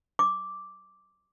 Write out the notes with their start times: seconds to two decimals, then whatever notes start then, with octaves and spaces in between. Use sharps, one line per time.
0.19 D6